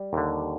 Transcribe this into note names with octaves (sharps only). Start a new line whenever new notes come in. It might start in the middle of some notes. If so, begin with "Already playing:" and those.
Already playing: G3
D#2 D3